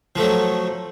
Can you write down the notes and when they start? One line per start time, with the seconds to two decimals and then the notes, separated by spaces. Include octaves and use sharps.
0.16 F3
0.18 A3
0.21 F#3